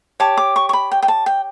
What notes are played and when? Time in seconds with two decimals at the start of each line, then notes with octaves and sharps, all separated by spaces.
0.20 G4 C#5 A5
0.37 D6
0.56 C#6
0.69 C#6
0.73 B5
0.92 G5
1.03 G5
1.08 A5
1.26 G5